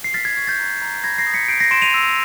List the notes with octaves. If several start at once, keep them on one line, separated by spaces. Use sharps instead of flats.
C7
F6 A6 B6
G#6
C#6 G#6
G6 A6
A#5
A#5
B5 G#6 A#6
A#6 C7
D#6
B6 C#7
G6 C7 D7
A#6 C7
C6 D7 E7
D#7 F7
E6